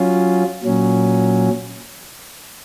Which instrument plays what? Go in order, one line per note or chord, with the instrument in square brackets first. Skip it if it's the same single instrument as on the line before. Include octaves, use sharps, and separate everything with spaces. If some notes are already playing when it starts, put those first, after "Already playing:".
Already playing: [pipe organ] F#3 C#4 F4
A#2 F#3 C#4